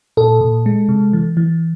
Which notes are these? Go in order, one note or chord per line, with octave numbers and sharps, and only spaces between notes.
A#2 A4
A#2
G#3
C3
E3
E3